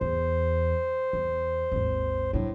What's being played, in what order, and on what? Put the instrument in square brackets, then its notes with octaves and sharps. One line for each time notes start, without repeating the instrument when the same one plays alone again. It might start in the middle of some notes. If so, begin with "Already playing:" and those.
[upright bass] E2 [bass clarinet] C5
[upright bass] E2
G#1 D#2
[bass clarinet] A2 [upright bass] F#3 D4